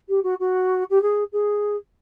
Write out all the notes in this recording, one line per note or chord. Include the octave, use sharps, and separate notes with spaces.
G4
F#4
F#4
G4
G#4
G#4